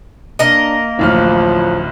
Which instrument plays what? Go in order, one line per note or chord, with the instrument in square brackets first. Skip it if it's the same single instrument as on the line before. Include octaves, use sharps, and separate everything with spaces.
[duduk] A#3 [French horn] D4 [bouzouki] A#4 D#5
[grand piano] D1 A1 F6 [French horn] F3